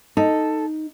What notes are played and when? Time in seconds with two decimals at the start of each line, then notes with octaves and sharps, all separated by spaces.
0.17 D#4 A4